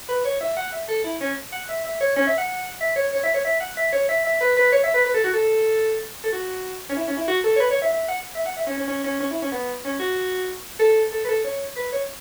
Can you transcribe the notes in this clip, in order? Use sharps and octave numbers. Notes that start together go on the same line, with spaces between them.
B4
C#5
E5
F#5
E5
A4
E4
C#4
F#5
E5
E5
C#5
C#4
E5
F#5
E5
C#5
C#5
E5
C#5
E5
F#5
E5
C#5
E5
E5
B4
B4
C#5
E5
B4
B4
A4
F#4
A4
A4
F#4
C#4
E4
C#4
E4
F#4
A4
C#5
B4
C#5
E5
E5
F#5
E5
F#5
E5
C#4
C#4
C#4
C#4
C#4
E4
C#4
B3
C#4
F#4
A4
A4
B4
A4
C#5
B4
C#5